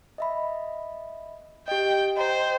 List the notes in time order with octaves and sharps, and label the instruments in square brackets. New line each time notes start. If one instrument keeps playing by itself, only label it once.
[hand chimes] D#5 E5 B5
[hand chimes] G4 D#5 [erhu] G5
[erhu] C5 [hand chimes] D#5 G5 A#5